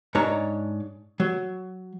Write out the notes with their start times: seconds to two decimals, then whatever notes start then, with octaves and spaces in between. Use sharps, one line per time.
0.15 G#2 D4 C#5 A#5
1.20 F#3